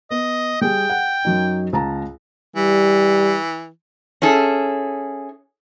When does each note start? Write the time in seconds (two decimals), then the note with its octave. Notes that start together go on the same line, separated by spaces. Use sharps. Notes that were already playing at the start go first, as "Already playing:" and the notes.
0.11 B3 D#5
0.62 G3 G#4 G5
0.90 F#5
1.25 F#2 F#3 D#4
1.73 C#2 A5 A#5
2.56 E3 G3
4.22 C#4 E4 G#4 A4